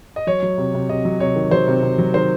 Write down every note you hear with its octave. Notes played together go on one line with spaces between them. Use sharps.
D#5
F#3 C#5
F#3
C3
C3
C3 D#5
F#3
C3 C#5
D#3
F#3 C5
C3
C3
F#3
D#3 C5